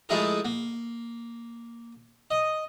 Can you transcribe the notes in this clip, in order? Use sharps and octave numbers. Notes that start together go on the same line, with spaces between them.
F3 G#3 A3 E4 G#4 A#4
A#3
D#5